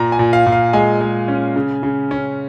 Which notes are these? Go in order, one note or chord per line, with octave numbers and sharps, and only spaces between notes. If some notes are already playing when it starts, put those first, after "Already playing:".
Already playing: A#2 A#5
G#5
A#2
F5
A#2
F5
G#3 G#5
G#3
C#4
C#3
C#3
C#4